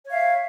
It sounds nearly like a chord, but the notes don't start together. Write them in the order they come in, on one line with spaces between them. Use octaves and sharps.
C#5 F5 E5